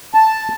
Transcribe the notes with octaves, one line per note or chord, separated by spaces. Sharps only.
A5